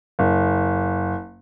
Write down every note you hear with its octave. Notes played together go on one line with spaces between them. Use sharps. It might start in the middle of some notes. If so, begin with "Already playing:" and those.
F#1